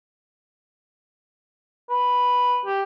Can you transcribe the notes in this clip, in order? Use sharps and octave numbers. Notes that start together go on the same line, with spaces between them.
B4
G4